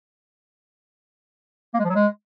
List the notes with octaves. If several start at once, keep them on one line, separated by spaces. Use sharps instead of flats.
A#3
G#3
F3
F#3
G#3